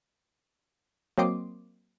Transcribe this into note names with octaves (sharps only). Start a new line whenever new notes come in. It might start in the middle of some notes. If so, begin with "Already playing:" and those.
F#3 A#3 C4 D#5 C6 D6